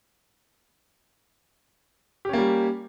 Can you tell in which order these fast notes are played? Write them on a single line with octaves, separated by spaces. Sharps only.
G4 C#4 A#3 G3